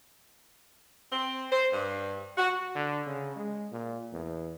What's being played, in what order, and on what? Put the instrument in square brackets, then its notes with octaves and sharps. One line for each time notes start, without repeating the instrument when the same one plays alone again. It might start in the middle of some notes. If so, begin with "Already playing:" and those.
[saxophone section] C4
C5
G2
F#4
[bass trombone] D3
C#3
G#3
A#2
E2